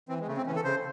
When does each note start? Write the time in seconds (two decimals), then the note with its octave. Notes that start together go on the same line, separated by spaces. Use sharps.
0.09 E3 C4
0.20 G#3
0.27 C#3 A3
0.37 C4
0.46 E3 C#4
0.56 A4
0.64 C#3 C5